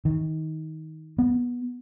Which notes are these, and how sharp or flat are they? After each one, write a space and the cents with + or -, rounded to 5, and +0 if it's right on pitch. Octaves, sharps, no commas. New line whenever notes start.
D#3 +20
B3 -15